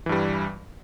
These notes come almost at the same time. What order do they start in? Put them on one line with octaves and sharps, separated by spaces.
E3 G2 G3